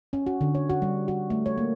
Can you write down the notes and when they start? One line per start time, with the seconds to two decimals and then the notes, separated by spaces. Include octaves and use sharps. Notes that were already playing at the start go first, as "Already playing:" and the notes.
0.13 C#4
0.27 F#4
0.41 D3
0.55 C#5
0.70 F#4
0.82 G3
1.08 F#4
1.30 A3
1.46 C#5
1.58 A#3